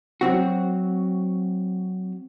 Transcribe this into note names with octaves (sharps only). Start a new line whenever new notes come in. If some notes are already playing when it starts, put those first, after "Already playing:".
F#3 C4 F#4